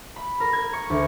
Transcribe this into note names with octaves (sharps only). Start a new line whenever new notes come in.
B5
A#4
G#6
C#6
D2